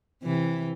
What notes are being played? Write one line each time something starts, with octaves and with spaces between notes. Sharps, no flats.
C3 E3